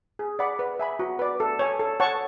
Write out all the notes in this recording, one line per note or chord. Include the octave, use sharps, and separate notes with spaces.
G#4
D5 F#5 B5
B4
E5 G#5 B5
F#4
B4 D5
A4
C#5 G#5
A4
C#5 F#5 A5 C#6